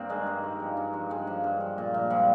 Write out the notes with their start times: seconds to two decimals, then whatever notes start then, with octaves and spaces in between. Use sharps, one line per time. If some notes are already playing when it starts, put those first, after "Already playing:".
Already playing: G2 A#3 C4
0.09 D#3 G#3
0.27 G2
0.43 D#3
0.60 F3
0.77 G2
0.93 G2
1.10 G2 G#3
1.27 F3
1.44 G2
1.60 F3
1.78 A#2
1.94 A#2
2.10 F3 G3